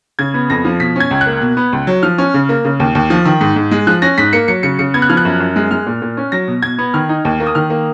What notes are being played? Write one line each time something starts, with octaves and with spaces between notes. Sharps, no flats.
C#3 G#6
B3
F2 A#6
F3
B2 B6
C#4 G#6
C#2
F#6
A#3
B2
B3
C#2
F#3
F3 F6
C#4
C#3
A#3
C#3
D#2
D#2
F3
D#3
G#2
G#2
G#3
F3 F#6
C#4 A#6
G#2 B6
A#3 C#7
F#3 C#7
C#3 C#7
C#3 C#7
B3 G#6
F#6
F3 F6
F#6
F#2
F#2
G#3
G#3 F6
A#2
A#2
C#4
F#3 A#6
B2
B2 G#6
B3
D#3 F6
D#4
D#2
A#3
D#6
D#3 F6
A#3